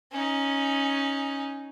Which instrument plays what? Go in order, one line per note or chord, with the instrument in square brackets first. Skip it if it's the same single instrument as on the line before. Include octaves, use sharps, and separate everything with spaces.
[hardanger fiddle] C#4 D#4